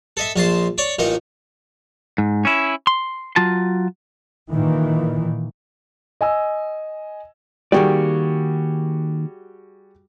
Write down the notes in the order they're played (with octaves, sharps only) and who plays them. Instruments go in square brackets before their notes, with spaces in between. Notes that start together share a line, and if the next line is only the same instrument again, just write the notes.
[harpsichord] A4 D#5 E5
A#1 D#5 A5 C6
C#5 D5
A1 A#2 D#4 D#5
[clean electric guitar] G#2
C#4 E4
C6
F#3 F4 A5
[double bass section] A#2 D#3 E3
[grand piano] D#5 G#5 E6
[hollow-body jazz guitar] D#3 A#3 D5 [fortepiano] G3 F#4 G#4